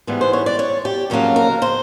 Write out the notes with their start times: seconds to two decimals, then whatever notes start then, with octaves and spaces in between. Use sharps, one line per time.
0.07 G#2 E3 G3 B3
0.21 C5
0.33 C#5
0.46 D5
0.59 C#5
0.85 G4
1.10 F2 C#3 F#3 A#3 D#4 A#4
1.36 A#4
1.62 C5